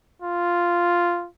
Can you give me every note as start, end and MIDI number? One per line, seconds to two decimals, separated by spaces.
0.22 1.28 65